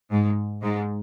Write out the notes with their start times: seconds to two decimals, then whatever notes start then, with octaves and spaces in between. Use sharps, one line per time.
0.11 G#2
0.62 G#2